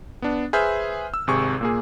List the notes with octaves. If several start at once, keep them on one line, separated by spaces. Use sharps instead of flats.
B3 D4
G#4 B4 C5 E5 F6 G6
E6
G#1 C3 G#4 C#6
A#2 A#3 G#4